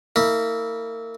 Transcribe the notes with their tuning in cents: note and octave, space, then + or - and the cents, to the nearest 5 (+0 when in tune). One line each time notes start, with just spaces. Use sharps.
A#3 -35 E4 -25